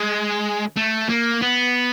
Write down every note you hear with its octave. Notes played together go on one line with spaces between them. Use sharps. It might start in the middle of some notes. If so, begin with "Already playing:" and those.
Already playing: G#3
A3
A#3
B3